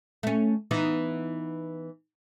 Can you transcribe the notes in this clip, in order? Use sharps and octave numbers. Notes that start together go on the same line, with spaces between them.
A3 C#4
E3 B3 D#4